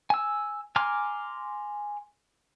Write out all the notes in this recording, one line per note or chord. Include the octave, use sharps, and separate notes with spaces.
G#5 E6
G#5 A#5 C6 D6 F6